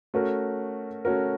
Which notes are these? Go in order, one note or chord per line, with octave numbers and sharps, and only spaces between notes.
A3 C#4 F#4 A#4
A3 C#4 F#4 A#4